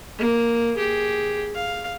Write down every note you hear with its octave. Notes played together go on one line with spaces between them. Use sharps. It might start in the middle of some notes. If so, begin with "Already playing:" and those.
A#3
G4 G#4
F5